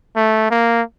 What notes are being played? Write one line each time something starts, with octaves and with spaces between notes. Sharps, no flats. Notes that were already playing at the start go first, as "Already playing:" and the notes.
A3
A#3